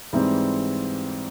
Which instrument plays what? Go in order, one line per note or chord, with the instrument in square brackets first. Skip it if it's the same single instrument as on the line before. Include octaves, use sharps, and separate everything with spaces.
[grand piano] G#2 E3 G3 C4